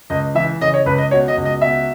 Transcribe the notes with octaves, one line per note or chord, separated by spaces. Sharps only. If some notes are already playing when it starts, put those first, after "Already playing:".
C#2 D#5
E3 E5
C#3 D#5
C#5
C#2 B4
D#5
B2 C#5
D#5
C#2
D#5
B2 E5